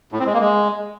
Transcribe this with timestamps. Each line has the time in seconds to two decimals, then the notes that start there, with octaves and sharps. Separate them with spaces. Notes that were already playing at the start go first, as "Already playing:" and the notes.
0.12 A2
0.19 C4
0.26 G#3
0.33 A#3
0.40 G#3